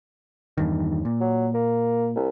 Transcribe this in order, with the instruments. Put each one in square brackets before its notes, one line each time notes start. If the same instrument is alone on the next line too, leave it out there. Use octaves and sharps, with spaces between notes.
[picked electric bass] E2 G2 D#3
A#2
[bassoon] F#3
A#3
C2